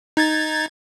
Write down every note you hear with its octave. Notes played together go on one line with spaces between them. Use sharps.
D#4 G#6 A6